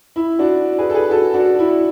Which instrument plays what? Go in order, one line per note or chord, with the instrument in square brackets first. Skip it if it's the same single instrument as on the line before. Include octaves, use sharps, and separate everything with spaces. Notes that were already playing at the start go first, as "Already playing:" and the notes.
[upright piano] E4
D4 F#4
G#4 B4
A4
G#4 B4
F#4 A4
D4 F#4
E4